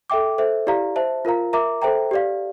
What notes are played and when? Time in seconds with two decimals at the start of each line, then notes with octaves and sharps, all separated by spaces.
0.10 A4 E5 G5 D6
0.38 A4 C5 E5
0.67 E4 G4 D5 F5 A#5
0.96 C5 E5 A5
1.25 F4 A#4 F5 A#5
1.53 A#4 E5 A#5 D6
1.82 A4 C5 E5 G5 A#5
2.11 G4 D5 F5